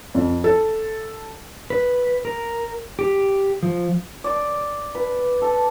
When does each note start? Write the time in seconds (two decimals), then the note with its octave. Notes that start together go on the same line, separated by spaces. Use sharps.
0.15 F2
0.44 A4
1.70 B4
2.25 A#4
2.99 G4
3.63 F3
4.24 D5
4.95 B4
5.42 A4